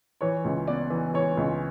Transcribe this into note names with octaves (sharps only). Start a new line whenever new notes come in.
E3 C#5
C#2
B3 D5
E3
E3 C#5
C#2